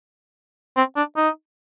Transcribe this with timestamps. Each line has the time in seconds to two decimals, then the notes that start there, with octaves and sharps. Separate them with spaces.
0.77 C4
0.96 D4
1.17 D#4